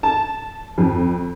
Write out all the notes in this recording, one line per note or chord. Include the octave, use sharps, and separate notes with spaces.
A5
F2